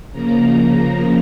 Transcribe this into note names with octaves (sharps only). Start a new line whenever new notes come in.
C#3 F3 A#3 A#5